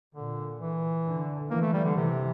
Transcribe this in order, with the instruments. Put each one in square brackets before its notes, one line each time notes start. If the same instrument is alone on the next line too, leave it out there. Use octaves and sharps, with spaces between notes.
[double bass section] A#2 [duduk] D3
[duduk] E3
[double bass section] D3
[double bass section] E3 [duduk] A#3
[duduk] A3
G3
D3
[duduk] C3 [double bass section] E3